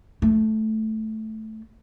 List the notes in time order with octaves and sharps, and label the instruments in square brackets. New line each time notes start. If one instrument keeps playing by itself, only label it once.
[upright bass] A3